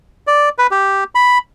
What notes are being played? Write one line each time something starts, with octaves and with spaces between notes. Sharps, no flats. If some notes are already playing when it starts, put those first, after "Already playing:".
D5
B4
G4
B5